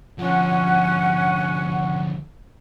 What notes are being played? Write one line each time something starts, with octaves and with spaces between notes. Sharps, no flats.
D2 F3 C#4 F#5